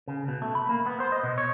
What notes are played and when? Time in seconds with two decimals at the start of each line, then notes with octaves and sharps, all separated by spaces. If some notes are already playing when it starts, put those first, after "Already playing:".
0.08 C#3
0.28 B2
0.42 A3
0.55 B5
0.69 A#3
0.87 B3
1.00 C5
1.12 D#5
1.23 B2
1.38 C#5